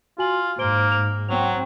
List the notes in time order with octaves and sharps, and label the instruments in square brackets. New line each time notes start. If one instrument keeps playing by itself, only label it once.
[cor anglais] F4 [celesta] F#4 G#5 F#7
[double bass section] G#2 [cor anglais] A#3 [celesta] C5 D7 G7
[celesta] F7
[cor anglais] F#3 [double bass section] C4 [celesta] F7